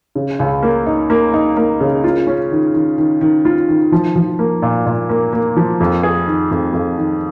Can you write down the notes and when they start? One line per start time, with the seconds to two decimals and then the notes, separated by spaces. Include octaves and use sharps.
0.15 C#3
0.40 C#2
0.63 A#3
0.86 D#4
1.10 A#3
1.34 D#4
1.57 A#3
1.80 C#3
2.04 F4
2.27 C#4
2.51 D#3
2.74 D#3
2.98 D#3
3.21 D#3
3.45 F4
3.68 D#3
3.92 F3
4.16 F3
4.39 A#3
4.62 A#2
4.86 A#2
5.09 A#3
5.33 A#3
5.57 F3
5.80 F2
6.03 G#4
6.27 D#3
6.51 F2
6.74 F2
6.97 D#3